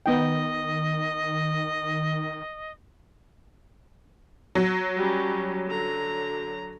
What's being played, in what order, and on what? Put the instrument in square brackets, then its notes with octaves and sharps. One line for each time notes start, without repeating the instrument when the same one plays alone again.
[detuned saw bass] D#3 [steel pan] B3 D#4 G5 [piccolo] D#5
[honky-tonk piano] F#3
[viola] G3 C#4
D3 A#5